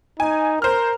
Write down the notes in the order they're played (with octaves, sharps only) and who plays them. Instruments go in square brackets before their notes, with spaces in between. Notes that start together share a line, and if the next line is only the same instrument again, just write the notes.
[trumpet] D#4 [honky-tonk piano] G#5
[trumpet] A#4 [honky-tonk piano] C5 F6